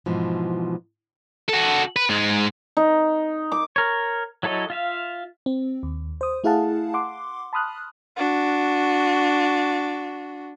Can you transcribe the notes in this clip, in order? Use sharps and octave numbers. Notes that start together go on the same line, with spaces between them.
G#2 B2 E3 F3
F#4 A4
B4
G#2 G#3
D#4
D6
A#4 C#5
F#3 E4 A4 C#5 D#5
F4 E5 F5
C4
D#2
C5 D#6
A3 E4 G#4 F5 F#5 A5
F#5 C6 D6
A5 B5 C6 D#6 F6 F#6
D4 F#4